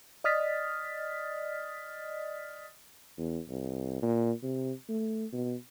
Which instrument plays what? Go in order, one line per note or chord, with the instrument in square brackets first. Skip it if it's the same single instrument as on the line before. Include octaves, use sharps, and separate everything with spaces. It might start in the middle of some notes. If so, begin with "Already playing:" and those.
[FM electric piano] D5 D#5 D#6 F6 A6 B6
[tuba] E2
C2
A#2
C3
A3
B2